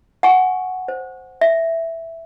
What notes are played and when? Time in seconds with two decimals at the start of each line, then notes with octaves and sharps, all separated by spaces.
0.23 F#5 G#5 C#6
0.88 C5
1.41 E5